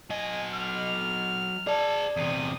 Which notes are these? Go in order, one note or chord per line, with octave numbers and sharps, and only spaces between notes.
F#3 D#5 G#5
F6
G#4 D5 A5
E2 C3 D#6